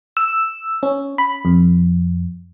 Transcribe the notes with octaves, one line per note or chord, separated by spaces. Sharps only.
E6
C#4
B5
F2